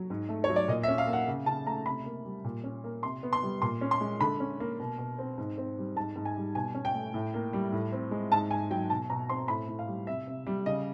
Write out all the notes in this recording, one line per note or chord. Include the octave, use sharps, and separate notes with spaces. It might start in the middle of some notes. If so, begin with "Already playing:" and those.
Already playing: F#3
G#2
A3
C#5
F#3
D5
A#2 D#5
E5
C#4
F5
A#3
F#5
C#3
C#3 A5
A3 A#5
C3 B5
A#3
G3
A#2
C#4
A#3
C3 C6
B3
C6
G3
A#2 C6
C#4
C6
G#3
D3 B5
C#4
A#3
B2
B2
C4
G#2
C4
G3
G#2 A5
G#2
G#5
G3
B2 G#5
C#4
G5
A3
A2
A#3
G3
A2
C4
G#3
G#2 A5
G#2 G#5
F#3 G5
B2 A5
B2 A#5
C4 C6
A2 B5
A2
F5
G3
C3 E5
C3
G3
C#3 D#5